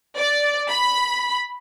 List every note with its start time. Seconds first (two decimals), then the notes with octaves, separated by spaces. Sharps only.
0.17 D5
0.70 B5